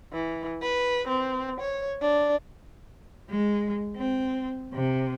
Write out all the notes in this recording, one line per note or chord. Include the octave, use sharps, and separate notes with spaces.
E3
B4
C4
C#5
D4
G#3
C4
C3